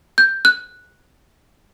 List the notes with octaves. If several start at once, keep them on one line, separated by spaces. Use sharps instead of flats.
G6
F#6